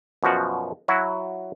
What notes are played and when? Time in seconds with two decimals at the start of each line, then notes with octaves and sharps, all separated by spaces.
0.23 F#2 B2 F3 F#4
0.88 F#3 E4 F#4